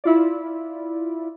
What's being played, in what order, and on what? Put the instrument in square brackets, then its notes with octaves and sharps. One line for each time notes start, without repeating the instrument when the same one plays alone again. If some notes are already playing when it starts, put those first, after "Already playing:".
[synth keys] E4 F4 D5